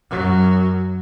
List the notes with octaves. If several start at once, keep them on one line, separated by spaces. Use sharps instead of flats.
F#2 F#3